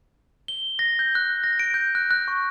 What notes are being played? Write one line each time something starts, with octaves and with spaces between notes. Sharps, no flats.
G7
A#6
G6
F#6
A#6
D7
G6
F#6
F#6
C#6